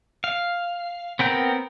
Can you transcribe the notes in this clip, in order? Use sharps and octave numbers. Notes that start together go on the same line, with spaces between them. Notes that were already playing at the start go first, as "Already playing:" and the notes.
F5
B3 C4 A#4 G6